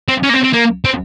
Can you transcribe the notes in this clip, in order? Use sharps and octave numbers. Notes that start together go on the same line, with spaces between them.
C4
C#4
A#3
C4
C4
A#3
C4